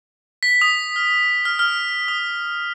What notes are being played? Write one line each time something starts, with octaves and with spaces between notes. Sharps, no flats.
B6
D#6
F6
F6
F6
D#6